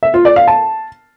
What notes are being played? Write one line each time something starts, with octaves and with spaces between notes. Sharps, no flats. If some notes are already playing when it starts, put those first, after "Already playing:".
E5
F4
D5
F5
A5